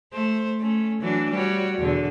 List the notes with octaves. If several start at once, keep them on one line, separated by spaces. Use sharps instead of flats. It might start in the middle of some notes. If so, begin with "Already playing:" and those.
A3 C5
A3 C#4
E3 F#3 D4
G3 F#4 C#5
E2 B2 D3